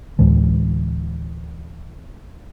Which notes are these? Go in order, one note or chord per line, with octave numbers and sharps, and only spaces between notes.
D2 A2 E3 G#3